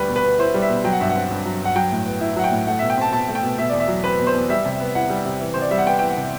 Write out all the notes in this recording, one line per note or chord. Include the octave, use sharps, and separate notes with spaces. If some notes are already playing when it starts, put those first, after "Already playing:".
Already playing: D2 G3 B4
B2
B4
B3
E4 C5
G3
E5
B2
F#3 G5
F#5
G2 E5
F#5
C4
G2
F#3
G2
F#5
F#3 G5
A2
B3
E4
F#3 F#5
G5
A2
A3 F#5
B2 E5
G5
C4 A5
B2 A5
A3
G5
B2
B2 E5
E2 D5
E5
F#3
C4 B4
B2
C5
E2
G3 E5
C3
B3
E4 F#5
G3
C3
E3
C3 C5
D5
G3 E5
F#5
B3 G5
E3 G5
F#5
C3